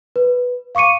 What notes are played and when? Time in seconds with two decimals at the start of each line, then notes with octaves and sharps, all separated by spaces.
0.16 B4
0.75 F5 C#6 D6 C#7 D#7